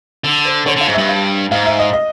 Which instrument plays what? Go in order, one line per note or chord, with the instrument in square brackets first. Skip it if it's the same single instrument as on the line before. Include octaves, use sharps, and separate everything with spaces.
[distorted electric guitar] D3
[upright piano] C5
[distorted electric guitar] D3 [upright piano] C#5
[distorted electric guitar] D3 [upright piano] F5
[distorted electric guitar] G#2
[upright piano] E5
[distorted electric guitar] G2
[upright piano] F5
[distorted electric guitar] G#2 [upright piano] F5
[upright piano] E5
D#5
D#5